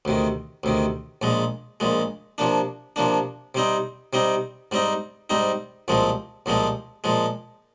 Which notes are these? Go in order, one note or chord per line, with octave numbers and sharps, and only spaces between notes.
D2 C3 D#3
D2 C3 D#3
A#1 A#2 G#3
A#1 A#2 G#3
C3 F3 A#3 D4
C3 F3 A#3 D4
C3 G3 C4 D#4
C3 G3 C4 D#4
G#2 G3 C4 D#4
G#2 G3 C4 D#4
C2 A#2 F3 G#3 C4
C2 A#2 F3 G#3 C4
A#2 F3 G#3